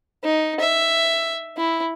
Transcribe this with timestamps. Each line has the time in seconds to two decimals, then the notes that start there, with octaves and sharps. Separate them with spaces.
0.24 D#4
0.60 E5
1.57 E4